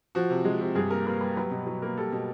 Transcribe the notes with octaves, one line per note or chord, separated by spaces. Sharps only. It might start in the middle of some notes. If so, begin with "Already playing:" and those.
F3 F#4
C3
G#3
C3
G2 G#4
A#3 A#4
A#3 B4
G3 B4
F#3 B4
B2
F#3
A#3
G3 A4
B2